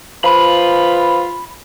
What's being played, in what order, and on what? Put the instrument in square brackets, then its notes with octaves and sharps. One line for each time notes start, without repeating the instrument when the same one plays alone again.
[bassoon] F3 [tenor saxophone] F4 [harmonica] B4 [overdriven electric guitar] B5